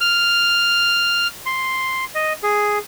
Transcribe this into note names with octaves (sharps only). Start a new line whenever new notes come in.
F6
C6
D#5
G#4